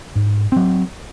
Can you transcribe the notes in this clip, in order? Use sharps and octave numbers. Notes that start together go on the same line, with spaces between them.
G#2
F#3 C4